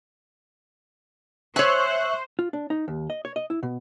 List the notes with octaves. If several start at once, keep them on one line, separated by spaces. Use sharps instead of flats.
C5 C#5 E5 G#5 C#6 F#6
F4
D4
D#4
D#2
D#5
C#5
D#5
E4
B2